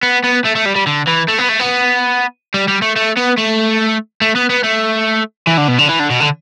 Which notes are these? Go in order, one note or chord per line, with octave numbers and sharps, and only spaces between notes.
B3
B3
A3
A3
G3
G3
D3
E3
A3
B3
A3
B3
G3
G3
A3
A3
B3
A3
A3
B3
B3
A3
E3
D3
B2
D3
E3
D3
B2
D3